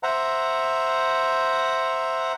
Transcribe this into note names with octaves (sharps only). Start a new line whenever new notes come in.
C5 E5 F#5 A#5